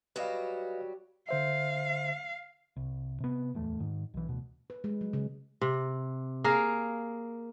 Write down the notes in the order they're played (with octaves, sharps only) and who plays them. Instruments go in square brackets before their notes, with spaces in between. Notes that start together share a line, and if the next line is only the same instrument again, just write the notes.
[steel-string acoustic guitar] F#3 G3 F#4 [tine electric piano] B4 D#5 F5
[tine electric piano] D3 C5 E5 [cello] F5
[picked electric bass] C2
C3 B3
D1 E2 A3
G#2 D#3
B1 E3
D2 B2
[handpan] B4
G#3
F#3
C#3
[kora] C3
A#3 G#4 A#4